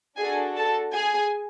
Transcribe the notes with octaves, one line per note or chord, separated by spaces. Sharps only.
D4 F#4 G#4 A4 G#5
A4 A5
G#4 G#5